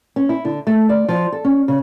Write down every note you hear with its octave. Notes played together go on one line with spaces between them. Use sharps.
C#4
E4
D3
A3
D5
F3
A4
C#4
C#3